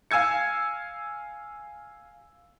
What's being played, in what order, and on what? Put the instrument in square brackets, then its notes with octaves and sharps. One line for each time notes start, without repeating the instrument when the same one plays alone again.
[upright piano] F5 G#5 E6 G#6 C#7